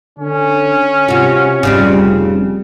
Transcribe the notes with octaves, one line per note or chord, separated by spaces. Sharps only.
D3 C#4
C3 F4 F#4
F1 C#3 G3 C4